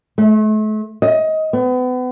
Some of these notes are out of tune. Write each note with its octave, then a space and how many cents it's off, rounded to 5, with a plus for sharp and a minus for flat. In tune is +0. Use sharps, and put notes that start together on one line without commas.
A3 -40
D#5 +20
B3 +35